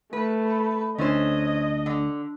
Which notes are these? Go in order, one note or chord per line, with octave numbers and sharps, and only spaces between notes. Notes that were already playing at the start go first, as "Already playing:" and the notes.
A3 B4
D2 C#4 D4 E4 C5 D#5
D3